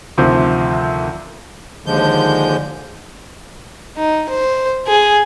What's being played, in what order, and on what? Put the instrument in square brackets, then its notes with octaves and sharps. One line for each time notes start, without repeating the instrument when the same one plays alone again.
[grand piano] D2 C3 D#3 F3 C4
[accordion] D#2 D3 F3 G#3 G6
[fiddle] D#4
C5
G#4